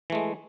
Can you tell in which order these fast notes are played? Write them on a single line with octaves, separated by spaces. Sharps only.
E3 A3 G#3